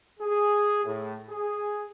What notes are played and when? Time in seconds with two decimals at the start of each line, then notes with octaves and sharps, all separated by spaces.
0.20 G#4
0.84 A2
1.29 G#4